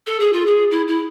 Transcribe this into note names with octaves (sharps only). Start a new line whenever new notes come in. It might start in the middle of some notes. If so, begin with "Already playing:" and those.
A4
G#4
F4
G#4
E4
E4